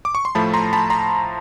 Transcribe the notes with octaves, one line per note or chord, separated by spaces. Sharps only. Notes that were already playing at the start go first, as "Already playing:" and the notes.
D6
C#6
C6
A2 F3 A3 A5 B5
A#5 C6
A5 B5
A#5 C6